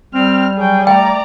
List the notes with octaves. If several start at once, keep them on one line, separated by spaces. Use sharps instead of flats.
G3 C4 F6
F#3 G#4 G5
A3 D5 G5 A#5